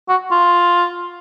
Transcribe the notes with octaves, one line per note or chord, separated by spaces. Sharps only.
F#4
F4